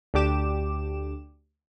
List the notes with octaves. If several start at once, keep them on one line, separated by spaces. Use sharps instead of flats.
D2 D4 G4 D6 E7